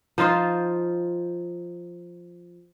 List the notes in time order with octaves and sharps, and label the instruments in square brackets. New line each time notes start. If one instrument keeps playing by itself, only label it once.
[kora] F3 D#4 F4 C5